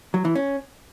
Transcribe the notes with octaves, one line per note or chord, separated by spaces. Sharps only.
F#3
E3
C#4